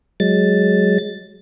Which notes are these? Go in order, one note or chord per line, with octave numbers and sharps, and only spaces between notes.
F#3 G#3 A6